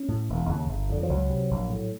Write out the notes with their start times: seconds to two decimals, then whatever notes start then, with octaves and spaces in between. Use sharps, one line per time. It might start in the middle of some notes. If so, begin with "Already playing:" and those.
Already playing: C#4
0.08 A2
0.29 E1
0.49 D#2 C#3
0.69 G1
0.89 F2 D3
1.03 F3
1.09 C#2 F#3
1.30 C3
1.51 A#1
1.70 A2